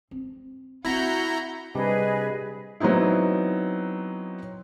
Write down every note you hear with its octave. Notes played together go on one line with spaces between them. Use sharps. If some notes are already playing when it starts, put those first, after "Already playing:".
C4
C4 E4 F#4 A#5 G6
C3 G3 D4 G#4 B4 D#5
F#3 B3 C4 D#4 E4